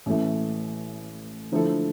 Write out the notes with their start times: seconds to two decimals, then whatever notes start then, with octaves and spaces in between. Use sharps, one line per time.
0.06 A1 A2 E3 A3
1.52 D3 F3 A3 E4 A4